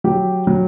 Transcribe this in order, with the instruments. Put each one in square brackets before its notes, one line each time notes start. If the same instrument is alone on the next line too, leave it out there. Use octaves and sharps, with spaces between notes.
[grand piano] F#3 G4
F#3